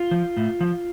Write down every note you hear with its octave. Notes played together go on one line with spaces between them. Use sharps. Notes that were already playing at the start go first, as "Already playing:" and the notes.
Already playing: F4
F3
A2
F3